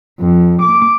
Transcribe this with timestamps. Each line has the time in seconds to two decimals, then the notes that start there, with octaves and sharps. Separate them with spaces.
0.21 F2
0.63 D6